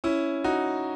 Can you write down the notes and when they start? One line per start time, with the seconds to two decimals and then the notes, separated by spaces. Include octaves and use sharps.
0.04 C#4 E4
0.44 D#4 F#4